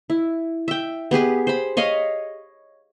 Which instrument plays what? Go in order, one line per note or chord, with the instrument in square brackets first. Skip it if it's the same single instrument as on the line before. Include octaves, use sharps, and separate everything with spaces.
[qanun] E4
E5 G5
B3 G4 G#4 B4
C5 B5
C#5 D#5 F5 B5